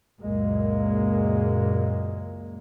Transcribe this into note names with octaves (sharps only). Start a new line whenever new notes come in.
C#2 F#2 A#2 G#3 A#3